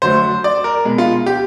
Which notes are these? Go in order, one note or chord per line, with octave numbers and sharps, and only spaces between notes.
D3 F#3 A3 C5
D5
A#4
B2 G#3
F4
G4